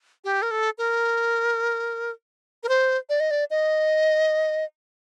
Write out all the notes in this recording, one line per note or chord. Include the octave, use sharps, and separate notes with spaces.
G4
A#4
A4
A#4
A#4
C5
D5
D#5
D5
D#5